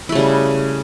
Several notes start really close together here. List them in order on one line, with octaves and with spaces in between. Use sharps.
E4 A3 C#3 G3